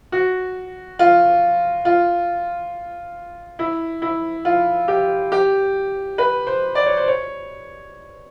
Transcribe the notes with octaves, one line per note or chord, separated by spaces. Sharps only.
F#4
F4
F4
E4
E4
F4
G4
G4
B4
C5
D5
C#5
C5
C#5